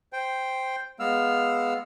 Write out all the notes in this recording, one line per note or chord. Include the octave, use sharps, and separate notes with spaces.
C5 G5
G#3 B3 F5 E6 F6